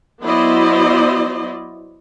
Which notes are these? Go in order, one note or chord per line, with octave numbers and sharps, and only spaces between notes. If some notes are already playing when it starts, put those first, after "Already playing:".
F#3 B3 E4 C5 D5 D#5